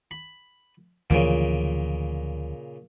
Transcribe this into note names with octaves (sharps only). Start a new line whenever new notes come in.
B5
D2 A#2 C#3 E3 F3